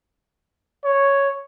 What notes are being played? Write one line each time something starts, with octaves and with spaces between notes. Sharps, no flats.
C#5